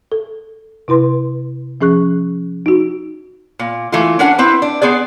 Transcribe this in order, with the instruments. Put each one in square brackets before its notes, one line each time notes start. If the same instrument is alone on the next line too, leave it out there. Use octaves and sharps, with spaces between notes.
[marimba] A4
C3 E4 B4 C6
F3 C#4 G#4 C#6 F#6
D#4 F#4
[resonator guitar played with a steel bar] A#2
E3 A3 A#3 F4
C#4 D4 A#4 F#5
C4 E4 B4
D4
B3 C4 G#4 D5